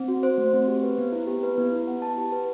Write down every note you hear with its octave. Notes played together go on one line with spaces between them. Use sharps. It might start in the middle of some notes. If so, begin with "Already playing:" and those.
Already playing: C4
F#4
C5
A3
C4
G4
B4
B3
E4
G4
B4
B3
E4
F#5
A5
G4
B4